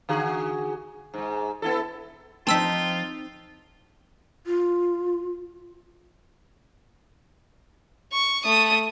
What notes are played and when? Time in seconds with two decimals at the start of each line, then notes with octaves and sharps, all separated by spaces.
0.09 D3 F#4 G#4
1.14 G#2 G#3
1.62 B3 E4 A4
2.47 F3 C4 D#4 F4 A5 E6 B6
4.46 F4
8.13 C#6
8.45 A3 D#6